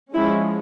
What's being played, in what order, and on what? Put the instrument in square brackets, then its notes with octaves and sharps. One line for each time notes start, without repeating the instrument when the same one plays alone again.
[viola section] F3 G#3 C#4 E4